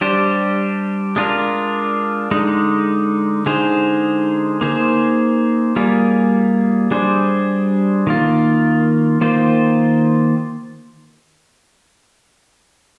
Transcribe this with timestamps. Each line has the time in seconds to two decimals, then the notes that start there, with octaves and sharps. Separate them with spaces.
0.01 G3 D4 G4 C5
1.16 G#3 D4 F4 A#4
2.31 D3 G#3 D#4
3.46 D3 G#3 D#4 G#4 C5
4.61 A#3 D#4 G#4 C5
5.76 G3 A#3 F4 G#4
6.91 G3 D4 G#4 C5
8.07 D#3 A#3 F4
9.21 D#3 A#3 F4 C5